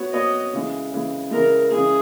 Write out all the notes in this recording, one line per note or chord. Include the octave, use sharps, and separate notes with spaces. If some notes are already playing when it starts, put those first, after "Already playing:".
Already playing: B3 F#4 C#5
B3 F#4 C#5 D#5
C#3 E3 G#3
C#3 E3 G#3
C#3 E3 G#3 A#4
C#3 E3 G#3 G#4